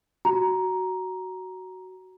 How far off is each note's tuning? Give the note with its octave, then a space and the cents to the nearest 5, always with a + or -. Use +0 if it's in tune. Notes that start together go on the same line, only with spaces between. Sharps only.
F#4 +10 A#5 +10